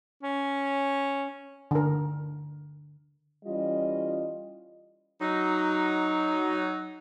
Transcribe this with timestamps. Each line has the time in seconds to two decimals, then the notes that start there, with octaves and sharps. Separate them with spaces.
0.23 C#4
1.71 D3 A#4
3.45 E3 G3 C#4 F4 D#5
5.20 F#3 D#4